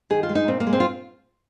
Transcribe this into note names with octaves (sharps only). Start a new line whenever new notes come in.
D#3 G#4
F4
G#3
D#4
A#2 C4
A#3
G#3
C4
F4